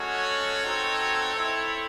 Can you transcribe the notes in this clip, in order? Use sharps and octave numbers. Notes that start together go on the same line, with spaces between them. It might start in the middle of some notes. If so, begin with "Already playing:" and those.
Already playing: G#3 C#4 F#4 A4 C#5
C4 D#4 F#4
C4 E4